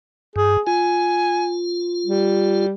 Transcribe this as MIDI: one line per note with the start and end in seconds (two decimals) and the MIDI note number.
0.36 0.57 43
0.36 0.60 68
0.67 2.66 65
0.67 1.53 80
2.06 2.74 55